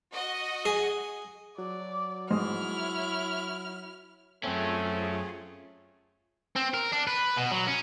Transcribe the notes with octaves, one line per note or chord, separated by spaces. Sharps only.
F#4 D#5
G#4
F#3 D5
G#2 E4 C5 C#5 D#5 F6
F#2 A3 C4 C#4 F4 G#4
C4
A#4
D4
B4
B2
F#3
C#4